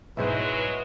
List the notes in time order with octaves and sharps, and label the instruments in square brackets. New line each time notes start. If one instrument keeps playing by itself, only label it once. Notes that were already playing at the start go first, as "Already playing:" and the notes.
[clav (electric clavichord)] B1 G#2 C5 [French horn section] F#3 G#3 [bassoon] E4 [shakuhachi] B4